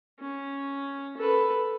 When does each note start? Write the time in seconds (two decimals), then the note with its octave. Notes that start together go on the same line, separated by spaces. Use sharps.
0.20 C#4
1.17 A4 B4